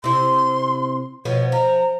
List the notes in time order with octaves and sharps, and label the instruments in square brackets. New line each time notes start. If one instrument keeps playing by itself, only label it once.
[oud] C3 E4 [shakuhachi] C6
[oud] B2 F3 B3 [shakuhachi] C#5
[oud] F3 [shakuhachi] A#5